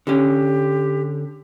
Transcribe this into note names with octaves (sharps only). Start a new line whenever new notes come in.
D3 C#4 G4